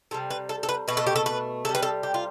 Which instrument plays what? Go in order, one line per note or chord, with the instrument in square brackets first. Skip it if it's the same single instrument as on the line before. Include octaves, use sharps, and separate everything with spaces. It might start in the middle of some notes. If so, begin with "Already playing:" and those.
[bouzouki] C3 G3 A4
B4
A4
A4
B4
B2 A3 B4
A4
G4
A4
B4
C3 G3 A4
B4
A4
G4
F4